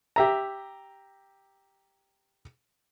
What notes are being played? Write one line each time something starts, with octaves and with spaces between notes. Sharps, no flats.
G4 E5 A#5